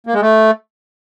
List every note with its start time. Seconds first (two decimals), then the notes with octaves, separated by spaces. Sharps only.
0.07 A#3
0.14 G#3
0.21 A3